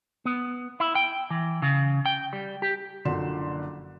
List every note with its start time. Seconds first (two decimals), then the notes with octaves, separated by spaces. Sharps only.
0.25 B3
0.80 E4
0.95 G5
1.30 E3
1.62 C#3
2.06 G5
2.33 G3
2.62 G4
3.05 F#1 D3 F3 F#4 C6 E7